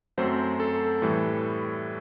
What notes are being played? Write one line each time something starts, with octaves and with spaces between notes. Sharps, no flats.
F#2 F#3 A3 C4 C5
A4
A2 E3 G3